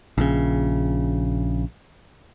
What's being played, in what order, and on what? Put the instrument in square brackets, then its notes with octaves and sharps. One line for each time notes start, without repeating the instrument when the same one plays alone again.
[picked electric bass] A#1 C#3